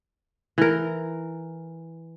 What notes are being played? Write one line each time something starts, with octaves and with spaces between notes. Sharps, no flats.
E3 A#4